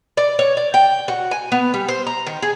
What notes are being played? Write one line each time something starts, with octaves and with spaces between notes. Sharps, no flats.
D5
C#5
D5
G5
F#4
G#5
B3
G3
C5
A#5
D#3
G#4